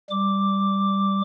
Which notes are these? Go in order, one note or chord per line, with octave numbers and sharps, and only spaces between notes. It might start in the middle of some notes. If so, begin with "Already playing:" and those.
G3 D6